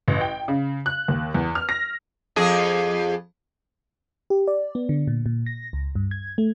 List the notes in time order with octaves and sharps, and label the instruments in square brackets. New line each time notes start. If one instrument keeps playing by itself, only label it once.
[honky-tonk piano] A1
G5
C#3
F#6
D#2
E2
F6
A#6
[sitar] F2 G#4
[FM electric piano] G4
D5
B3
D3
A#2
A#2
A#6
C#2
G2
G#6
A3